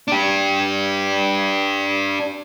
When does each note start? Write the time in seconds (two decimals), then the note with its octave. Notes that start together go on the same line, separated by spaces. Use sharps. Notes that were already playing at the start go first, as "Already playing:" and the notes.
0.08 D4 G4